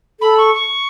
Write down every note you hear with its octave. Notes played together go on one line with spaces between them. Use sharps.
A4 B5
C#6
C#6